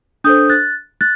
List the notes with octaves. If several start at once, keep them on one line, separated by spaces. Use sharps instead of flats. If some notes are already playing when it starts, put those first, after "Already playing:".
D4 A4 C5 D#6 G6
F#6 A6
F#6 A6